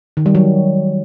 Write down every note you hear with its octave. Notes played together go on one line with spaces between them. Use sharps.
D#3
G3
F#3